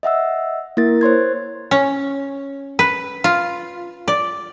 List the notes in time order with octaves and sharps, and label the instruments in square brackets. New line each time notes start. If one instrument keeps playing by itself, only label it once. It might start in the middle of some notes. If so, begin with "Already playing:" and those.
[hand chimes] D#5 E5 F#5 E6
A#3 E4 A#4 A6
C5 C#5 C6 G#6
[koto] C#4
B4
F4
D5